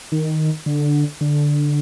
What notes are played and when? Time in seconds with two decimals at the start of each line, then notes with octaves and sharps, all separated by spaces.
0.12 D#3
0.66 D3
1.21 D3